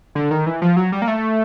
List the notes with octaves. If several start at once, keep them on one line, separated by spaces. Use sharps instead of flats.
D3
D#3
E3
F3
F#3
G3
A#3
A3